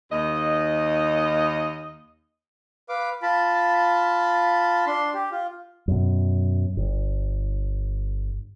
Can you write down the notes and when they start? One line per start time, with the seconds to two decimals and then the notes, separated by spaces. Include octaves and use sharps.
0.11 D#2 D#5
2.89 B4 F5 D6
3.22 F4 A5 B5
4.87 D4 C6
5.14 G4
5.31 F4
5.88 F#2 B2
6.77 G1